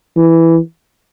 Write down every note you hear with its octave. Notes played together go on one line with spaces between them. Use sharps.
E3